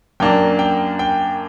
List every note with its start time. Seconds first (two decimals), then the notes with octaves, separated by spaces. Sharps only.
0.20 F#2 F#3 A#3 D4 G5
0.59 G5
0.99 G5